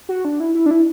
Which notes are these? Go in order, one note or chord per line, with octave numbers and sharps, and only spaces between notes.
F#4
D4
E4
E4
D4
E4